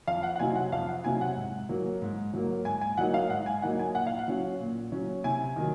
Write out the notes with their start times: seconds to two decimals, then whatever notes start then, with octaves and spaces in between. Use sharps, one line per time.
0.07 F2 F5
0.23 F#5
0.36 F#5
0.39 C3 F#3 C4 D#4 G#5
0.56 F#5
0.72 F2 F5
0.89 F#5
1.04 C3 F#3 C4 D#4 G#5
1.21 F#5
1.37 G#2
1.69 F#3 A#3
2.02 G#2
2.34 F#3 A#3
2.65 G#2 G#5
2.81 G#5
2.97 F#3 A#3 D#4 F#5
3.14 F5
3.30 G#2 F#5
3.46 G#5
3.62 F#3 A#3 D#4 F#5
3.79 G#5
3.94 A#2 F#5
4.07 F5
4.19 F#5
4.28 F#3 C#4
4.60 A#2
4.92 F#3 C#4
5.24 C3 G#5
5.56 D#3 F#3